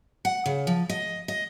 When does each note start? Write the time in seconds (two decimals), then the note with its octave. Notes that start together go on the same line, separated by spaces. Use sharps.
0.25 F#5
0.46 C#3
0.67 F3
0.89 D#5
1.28 D#5